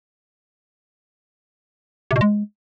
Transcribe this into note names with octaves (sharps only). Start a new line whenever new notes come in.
C3
B2
G#3